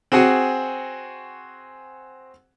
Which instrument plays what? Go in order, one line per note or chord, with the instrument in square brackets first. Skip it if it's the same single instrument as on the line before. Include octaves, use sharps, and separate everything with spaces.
[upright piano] C4 F#4 G#4 F#5 G#5